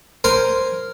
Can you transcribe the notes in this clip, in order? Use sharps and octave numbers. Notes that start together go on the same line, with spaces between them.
A#4 C5 G#5